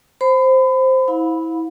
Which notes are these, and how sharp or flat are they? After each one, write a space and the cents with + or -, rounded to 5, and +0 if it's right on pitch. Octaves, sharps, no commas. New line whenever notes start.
C5 +0 B5 +30
E4 -25 F5 +35 B5 +0